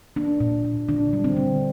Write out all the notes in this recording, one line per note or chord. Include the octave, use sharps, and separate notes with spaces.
A#3 D4
A#2
A#2
D3 D4
G3
C4
D3